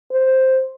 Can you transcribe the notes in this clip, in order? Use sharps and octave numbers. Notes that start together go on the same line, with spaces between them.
C5